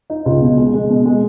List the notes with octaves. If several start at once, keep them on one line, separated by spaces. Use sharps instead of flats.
D#4
C#2
B2
G#3
G#3
B2
G#3